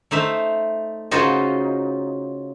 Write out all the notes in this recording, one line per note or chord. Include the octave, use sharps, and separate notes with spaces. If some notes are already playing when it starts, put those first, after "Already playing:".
A3 D#4 C5 E5
C#3 D#4 F4 F#4 C5 D#5